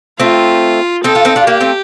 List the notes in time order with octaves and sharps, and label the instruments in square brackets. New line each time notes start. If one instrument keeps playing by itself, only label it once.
[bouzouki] A3 C4 [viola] F4
[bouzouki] C4 D#4 [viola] A4
[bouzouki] D4 F4
C4 D#4
D4 F4
[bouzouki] A#3 D4 [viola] G4
[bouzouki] A3 C4